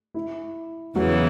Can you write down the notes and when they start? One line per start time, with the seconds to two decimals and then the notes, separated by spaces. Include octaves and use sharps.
0.14 E4
0.96 E2 C#3 E3 F#3 F#4